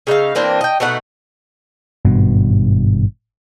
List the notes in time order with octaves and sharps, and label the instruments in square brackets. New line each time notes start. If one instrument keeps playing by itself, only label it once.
[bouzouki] C#3 D#4 E5 F5
E3 A#3 C4 D4
D#5 G5
B2 A3 D#4 F#5
[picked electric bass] G#1 G2 B2